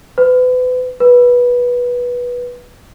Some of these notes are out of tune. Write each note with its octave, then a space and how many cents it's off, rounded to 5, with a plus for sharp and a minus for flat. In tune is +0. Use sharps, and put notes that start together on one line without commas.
B4 +35
B4 -15